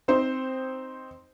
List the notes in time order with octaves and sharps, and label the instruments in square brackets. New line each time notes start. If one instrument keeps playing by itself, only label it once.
[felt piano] C4 D#4 C5